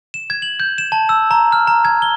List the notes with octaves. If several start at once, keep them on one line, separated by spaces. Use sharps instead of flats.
E7
G#6
F#7
G6
E7
A5
E6
A#5
F6
A#5
G#6
G7